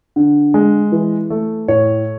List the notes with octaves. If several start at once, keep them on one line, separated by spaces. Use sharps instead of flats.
D3
G#3
E3
A3
A2 C#5